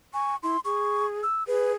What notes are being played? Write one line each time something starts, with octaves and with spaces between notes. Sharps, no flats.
G#5 C#6
E4 C6
G#4 C#6
E6
G#4 B4